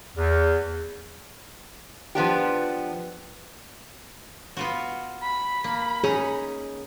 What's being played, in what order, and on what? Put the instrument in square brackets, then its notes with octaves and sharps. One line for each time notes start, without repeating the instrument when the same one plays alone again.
[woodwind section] E2
[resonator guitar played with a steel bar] F3 B3 D4 G4
[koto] B3 F4 F#4
[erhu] B5
[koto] A#3
[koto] C#4 D#4 A#5 [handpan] G#4